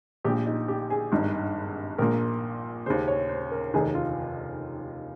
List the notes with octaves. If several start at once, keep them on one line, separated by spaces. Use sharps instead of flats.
A#1 A#2 G4
D#4
G4
G#4
G#1 G2 D#3
A#1 A#2 A#4
D#2 C#3 C5
C#5
C5
A#4
F1 D#2 D#3 G#4
F4